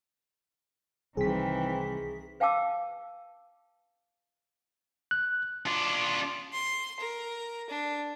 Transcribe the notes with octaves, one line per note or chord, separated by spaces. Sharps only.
C2 D#3 E3 C4 G#4 B6
B4 F5 G5 A5 D6 E6
F#6
D4 F4
C6
A#4
D4